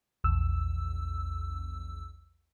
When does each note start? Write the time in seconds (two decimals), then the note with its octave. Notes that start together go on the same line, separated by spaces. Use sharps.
0.24 A#1 E2 E6